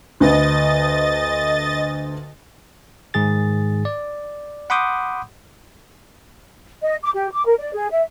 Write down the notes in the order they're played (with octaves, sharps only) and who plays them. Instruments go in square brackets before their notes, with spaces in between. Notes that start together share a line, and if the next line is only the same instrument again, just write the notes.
[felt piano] D2 D3 B4 [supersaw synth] D#5 A6
[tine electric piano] G#2 D#3 G#4 A6
D5
F#5 B5 C6 D6 D#6 G6
[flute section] D#5
D6
G4
D6
A#4
D5
G#4
E5